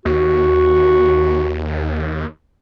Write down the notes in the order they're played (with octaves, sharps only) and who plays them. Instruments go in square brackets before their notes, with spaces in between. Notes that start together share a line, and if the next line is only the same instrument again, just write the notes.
[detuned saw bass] D#2 [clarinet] F#4